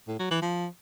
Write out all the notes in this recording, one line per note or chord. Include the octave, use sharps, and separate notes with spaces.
A2
F#3
E3
F3